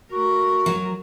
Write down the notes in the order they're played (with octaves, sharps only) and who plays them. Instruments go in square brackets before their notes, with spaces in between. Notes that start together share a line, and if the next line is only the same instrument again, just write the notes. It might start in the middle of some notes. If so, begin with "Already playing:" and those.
[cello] A3 A#4 [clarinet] F#4
[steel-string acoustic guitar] F#3